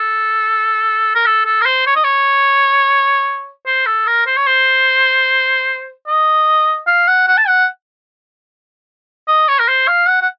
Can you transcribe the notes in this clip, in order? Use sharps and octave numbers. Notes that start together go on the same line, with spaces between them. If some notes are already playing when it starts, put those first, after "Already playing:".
Already playing: A4
A#4
A4
A4
A#4
C5
C#5
D#5
C#5
C5
A4
A#4
C5
C#5
C5
D#5
F5
F#5
F#5
A5
F#5
D#5
C#5
A#4
C5
F5
F#5
F#5